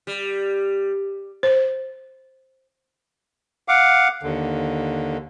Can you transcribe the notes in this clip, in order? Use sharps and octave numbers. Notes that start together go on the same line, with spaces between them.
G3
C5
F5 F#5 D6
D#2 D3